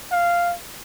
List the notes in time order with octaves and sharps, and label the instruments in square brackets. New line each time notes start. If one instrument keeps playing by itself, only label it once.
[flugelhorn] F5